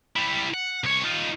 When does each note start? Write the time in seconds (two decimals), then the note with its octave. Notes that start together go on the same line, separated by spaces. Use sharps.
0.16 G3 E4
0.54 F#5
0.84 C2 C#5
1.04 D#4 F4